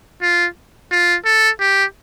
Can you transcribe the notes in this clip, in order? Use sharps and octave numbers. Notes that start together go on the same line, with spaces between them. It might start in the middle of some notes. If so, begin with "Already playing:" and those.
F4
F4
A4
G4